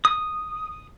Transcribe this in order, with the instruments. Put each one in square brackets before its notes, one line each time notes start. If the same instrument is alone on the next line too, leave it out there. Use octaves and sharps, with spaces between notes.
[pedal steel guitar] D#6